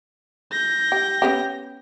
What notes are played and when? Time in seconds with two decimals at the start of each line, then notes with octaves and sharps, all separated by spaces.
0.52 G6 A#6
0.92 G4
1.22 B3 C#4 G4